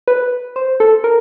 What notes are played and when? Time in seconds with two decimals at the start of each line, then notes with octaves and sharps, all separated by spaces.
0.08 B4
0.56 C5
0.80 A4
1.04 A#4